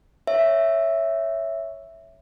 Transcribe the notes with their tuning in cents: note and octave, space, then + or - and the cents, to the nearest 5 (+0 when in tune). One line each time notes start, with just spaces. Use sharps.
C#5 +0 E5 +0